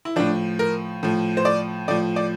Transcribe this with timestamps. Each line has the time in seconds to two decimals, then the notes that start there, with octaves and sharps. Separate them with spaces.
0.05 E4
0.16 A2 F3 D4
0.59 A#4
1.03 A2 F3
1.37 C5
1.45 D5
1.88 A2 F3 D5
2.16 D5